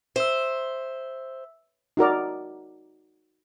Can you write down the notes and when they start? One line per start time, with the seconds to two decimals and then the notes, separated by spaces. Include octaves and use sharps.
0.16 C5 E5 E6
1.97 D#4 F#4 A#4 D5